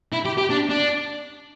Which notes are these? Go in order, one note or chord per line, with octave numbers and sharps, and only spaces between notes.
E4
G4
G4
D4
D4